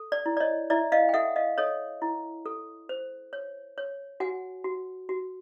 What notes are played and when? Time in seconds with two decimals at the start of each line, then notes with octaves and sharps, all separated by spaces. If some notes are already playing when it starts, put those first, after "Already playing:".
Already playing: A4
0.12 D5
0.26 E4
0.37 D5
0.40 C#5 D#5
0.70 E4 D5 E5
0.92 D#5 F5
1.09 G5
1.14 A4 E5 F#5
1.36 D#5 F5
1.58 A4 C#5 D#5
2.02 E4
2.46 A4
2.89 C5
3.33 C#5
3.78 C#5
4.20 F#4 F#5 G#5
4.64 F#4
5.09 F#4